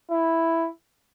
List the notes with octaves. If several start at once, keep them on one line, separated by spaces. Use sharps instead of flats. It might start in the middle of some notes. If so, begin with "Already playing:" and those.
E4